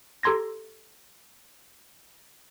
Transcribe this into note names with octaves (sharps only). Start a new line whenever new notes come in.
G4 A4 A#5 C6 G#6 A#6